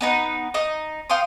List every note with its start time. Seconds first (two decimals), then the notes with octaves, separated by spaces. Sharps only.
0.01 B3 D#4 B4
0.54 D#4 D#5
1.10 F5 G5 C6 D#6